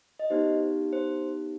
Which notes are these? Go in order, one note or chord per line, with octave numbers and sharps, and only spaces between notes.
D#5
B3 D#4 G4 C5
C5